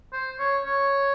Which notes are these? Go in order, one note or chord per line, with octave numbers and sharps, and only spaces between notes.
C5
C#5
C#5